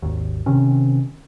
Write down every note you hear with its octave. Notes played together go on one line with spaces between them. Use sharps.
G#1 D#2
C3 D#3 C4 C#4